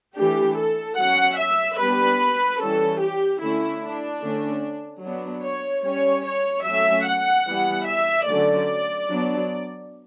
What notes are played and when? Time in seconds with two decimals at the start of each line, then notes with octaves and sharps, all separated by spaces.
0.16 E3 A3 D4 G4
0.56 A4
0.97 F#3 C#4 F#5
1.37 E5
1.78 G3 B3 D4 B4
2.60 E3 G3 C#4 A4
3.00 G4
3.40 D3 A3 C#4 E4
3.81 D4
4.21 D3 A3 C#4
5.03 F#3 B3 D4
5.43 C#5
5.84 G3 C#4 C#5
6.25 C#5
6.65 F#3 A3 C#4 E5
7.06 F#5
7.47 E3 G3 B3
7.87 E5
8.27 D3 F#3 A3 C#4 D5
9.08 F#3 B3 D4